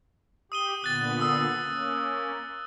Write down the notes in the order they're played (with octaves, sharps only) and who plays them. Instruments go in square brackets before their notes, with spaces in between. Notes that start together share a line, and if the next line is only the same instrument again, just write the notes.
[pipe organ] G4 [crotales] D#6 D#7 G7
[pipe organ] A#2 D3 B3 [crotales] F#6 A6
[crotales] D#6 E6
[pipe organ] A#3 C#4